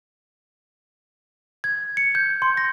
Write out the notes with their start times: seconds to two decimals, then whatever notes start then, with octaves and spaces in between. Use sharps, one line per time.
1.64 G#6
1.97 C#7
2.15 G6
2.42 C6
2.57 A#6